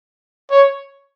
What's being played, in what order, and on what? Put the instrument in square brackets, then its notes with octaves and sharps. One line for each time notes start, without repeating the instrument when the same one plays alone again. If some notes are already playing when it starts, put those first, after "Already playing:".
[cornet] C#5